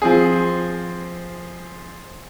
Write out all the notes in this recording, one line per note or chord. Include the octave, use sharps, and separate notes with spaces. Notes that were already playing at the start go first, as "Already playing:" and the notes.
F3 C4 G#4